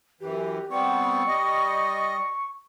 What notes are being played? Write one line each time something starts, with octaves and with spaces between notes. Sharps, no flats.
F#2 E3 G4
G3 B3 C4 C#6
G3 D#5